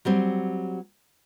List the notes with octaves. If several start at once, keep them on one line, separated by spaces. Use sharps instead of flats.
F#3 G3 C4